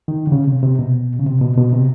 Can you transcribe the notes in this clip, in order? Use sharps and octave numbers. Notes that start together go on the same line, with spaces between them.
D#3
D3
C#3
C3
C3
B2
C#3
C3
B2
B2
C3